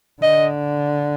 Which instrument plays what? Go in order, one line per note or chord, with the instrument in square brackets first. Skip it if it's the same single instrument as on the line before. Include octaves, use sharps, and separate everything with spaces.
[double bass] D3 [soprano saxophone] D#5